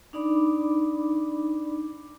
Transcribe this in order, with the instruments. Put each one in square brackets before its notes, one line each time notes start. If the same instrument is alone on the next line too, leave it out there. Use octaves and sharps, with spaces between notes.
[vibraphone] D4 D#4 D5 B5 D6